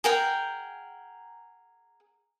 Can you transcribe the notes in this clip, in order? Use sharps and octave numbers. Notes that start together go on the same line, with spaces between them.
G#4 A#4 F#5 G5